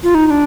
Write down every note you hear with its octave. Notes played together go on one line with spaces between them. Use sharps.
F4
D#4
D#4
D4